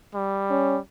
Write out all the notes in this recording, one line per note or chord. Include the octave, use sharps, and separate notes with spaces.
G3
C#4